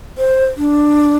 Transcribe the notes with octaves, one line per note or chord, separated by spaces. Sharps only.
C5
D4